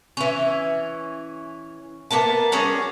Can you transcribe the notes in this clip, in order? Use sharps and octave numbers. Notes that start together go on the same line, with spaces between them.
E3 C#4
A#3 B3 A#4 A5
G3 C#4 F#4 G#4